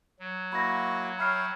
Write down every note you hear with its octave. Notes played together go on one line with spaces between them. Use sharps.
F#3
A#3 E4 F#4 B5 A#6
C#5 E5 G5 B5 F6 C7